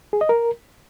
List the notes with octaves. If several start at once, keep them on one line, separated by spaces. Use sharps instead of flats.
G#4
D#5
A#4